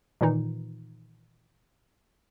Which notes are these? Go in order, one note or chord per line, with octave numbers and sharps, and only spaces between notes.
A#2 D#3 E3 D#4